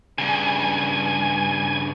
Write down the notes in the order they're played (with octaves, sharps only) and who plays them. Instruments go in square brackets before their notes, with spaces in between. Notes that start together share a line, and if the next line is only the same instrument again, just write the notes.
[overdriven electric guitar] G2 C#3 [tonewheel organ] G#5